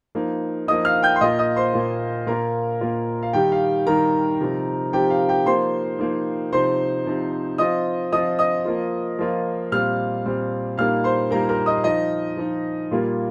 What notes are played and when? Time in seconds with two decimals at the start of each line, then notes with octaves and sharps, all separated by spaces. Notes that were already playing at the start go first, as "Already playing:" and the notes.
0.15 F3 A#3 D#4
0.67 F3 A#3 D#4 D#5 D#6
0.85 F5 F6
1.03 G5 G6
1.16 C6
1.21 A#2 A#3 F4 D#5 D#6
1.39 D#5 D#6
1.56 C5 C6
1.73 A#2 A#3 F4
2.27 A#2 A#3 F4 A#4 A#5
2.81 A#2 A#3 F4
3.23 F5
3.33 D#3 G3 D#4 G4 G5
3.52 F5
3.86 D#3 G3 D#4 A#4 A#5
4.41 C3 F3 D#4
4.93 C3 F3 D#4 G4 G5
5.10 F5
5.29 G4 G5
5.46 F3 A#3 D#4 C5 C6
5.99 F3 A#3 D#4
6.52 C3 F3 D#4 C5 C6
7.06 C3 F3 D#4
7.58 F3 C4 F4 D#5 D#6
8.12 F3 C4 F4 D#5 D#6
8.39 D#5 D#6
8.65 F3 A#3 F4
9.19 F3 A#3 F4
9.72 A#2 G3 C4 F5 F6
10.25 A#2 G3 C4
10.78 A#2 G3 A#3 D#4 F5 F6
11.04 C5 C6
11.31 A#2 G3 A#3 D#4 A#4 A#5
11.49 A#4 A#5
11.66 D#5 D#6
11.84 F3 D#4 D#5
12.37 F3 D#4
12.91 A#2 G3 A#3 F4